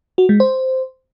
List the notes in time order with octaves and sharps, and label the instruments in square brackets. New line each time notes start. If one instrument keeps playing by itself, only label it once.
[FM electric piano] F#4
G#3
C5